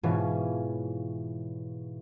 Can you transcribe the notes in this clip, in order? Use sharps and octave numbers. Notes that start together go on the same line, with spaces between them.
G#2 B2 E3 C#4 F4